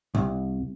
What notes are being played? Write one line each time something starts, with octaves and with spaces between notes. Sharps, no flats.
C2